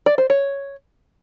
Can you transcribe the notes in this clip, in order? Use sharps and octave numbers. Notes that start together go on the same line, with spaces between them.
D5
C5
C#5